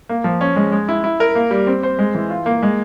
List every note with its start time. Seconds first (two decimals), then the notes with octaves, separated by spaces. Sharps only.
0.09 A#3
0.24 F3
0.41 C#4
0.56 G#3
0.72 G#3
0.89 E4
1.04 E4
1.20 A#4
1.35 A#3
1.51 G3
1.67 C4
1.83 C5
1.99 G#3
2.15 E3
2.30 F4
2.46 A#3
2.63 G#3